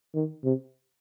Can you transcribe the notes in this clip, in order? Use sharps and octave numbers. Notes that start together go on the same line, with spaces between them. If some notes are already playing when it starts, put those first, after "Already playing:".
D#3
C3